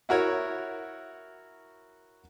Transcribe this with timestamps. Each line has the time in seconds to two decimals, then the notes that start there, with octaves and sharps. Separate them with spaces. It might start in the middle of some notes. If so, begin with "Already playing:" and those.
0.09 E4 F#4 A#4 C#5